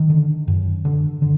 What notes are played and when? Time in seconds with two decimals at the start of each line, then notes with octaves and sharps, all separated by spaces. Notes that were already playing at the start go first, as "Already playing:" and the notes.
Already playing: D#3
0.10 D3
0.48 F#2
0.85 D3
1.22 D3